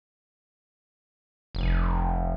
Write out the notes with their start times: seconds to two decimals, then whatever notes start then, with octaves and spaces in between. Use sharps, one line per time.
1.55 F1